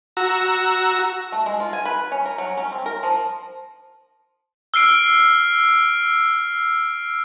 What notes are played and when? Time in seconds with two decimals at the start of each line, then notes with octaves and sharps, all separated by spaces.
0.17 F#4 A#5 E6
1.32 A3
1.46 G#3
1.60 F4
1.73 G#5
1.85 B4
2.12 C#4
2.26 A#4
2.38 F#3
2.57 C#4
2.72 C4
2.86 A#4
3.03 F3
4.74 E6 F6 C7 D7